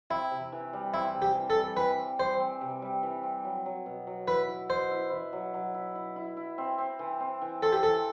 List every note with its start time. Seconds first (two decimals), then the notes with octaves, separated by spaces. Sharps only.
0.10 C4 E4
0.31 C3
0.52 E3
0.73 G3
0.94 C4 E4
1.14 C3
1.22 G4
1.35 E3
1.50 A4
1.57 G3
1.77 E3 B4
1.99 C4
2.19 G3 C5
2.40 C4
2.61 C3
2.82 G3
3.03 E3
3.23 C4
3.44 F#3
3.66 F#3
3.86 B2
4.07 F#3
4.27 E4 B4
4.48 E4
4.70 B2 C5
4.91 E4
5.12 E4
5.33 F#3
5.54 F#3
5.74 E4
5.95 E4
6.16 E4
6.37 E4
6.58 C4
6.78 C4
6.99 E3
7.20 C4
7.42 E3
7.62 C4 A4
7.73 G4
7.83 E3 A4